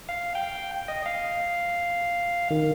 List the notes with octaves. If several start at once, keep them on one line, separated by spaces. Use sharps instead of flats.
F5
G5
D#5
F5
D#3